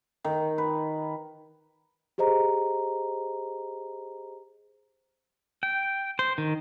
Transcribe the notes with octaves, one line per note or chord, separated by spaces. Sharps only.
D#3
B4
G4 G#4 C5 D#5 A#5
G5
C5
D#3